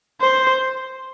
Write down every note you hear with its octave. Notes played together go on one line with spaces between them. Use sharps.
C5